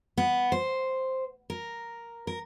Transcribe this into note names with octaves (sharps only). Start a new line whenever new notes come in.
B3
C5
A#4
A#4